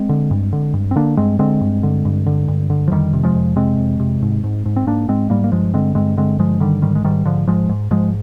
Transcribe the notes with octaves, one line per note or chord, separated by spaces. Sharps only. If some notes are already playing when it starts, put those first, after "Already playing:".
Already playing: G#3 C4
D3
G2
D3
G2
C4
D3 A#3 D4
G2 G#3 C4
D3 G#3 C4
G2
D3
G2
D3
G2
D3
F3
F2 D#3 G3
C3
F3 G#3
F2
C3 G#3 C4
F2
C3
G#2
G#2
G#2
C4
G#2 A#3 D4
G#2 G#3 C4
G#2 G3 A#3
A#3
G2 F3 G#3
D3 G#3 C4
G2 G#3 C4
D3 G#3 C4
G2 F3 G#3
D3 D#3 G3
G#2 D#3 G3
G#3
G#2 D#3 G3
G#2 D3 F3
G#2 F3 G#3
G#2
G#2 F3 G#3